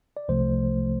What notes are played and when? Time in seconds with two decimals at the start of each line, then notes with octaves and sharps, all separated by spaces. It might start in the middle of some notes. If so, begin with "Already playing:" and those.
0.17 D5
0.29 C2 C3 F3 A3 C5